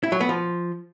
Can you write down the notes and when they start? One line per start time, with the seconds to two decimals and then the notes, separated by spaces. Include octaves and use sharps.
0.03 E4
0.12 F#3
0.21 B3
0.29 F3